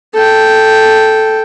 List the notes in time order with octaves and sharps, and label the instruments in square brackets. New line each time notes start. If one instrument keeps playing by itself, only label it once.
[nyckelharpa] A4 G5